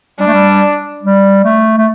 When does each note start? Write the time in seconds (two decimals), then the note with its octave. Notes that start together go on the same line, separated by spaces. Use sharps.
0.19 G3 D4
0.27 A3
0.34 G3
1.03 G3
1.44 A3
1.78 A3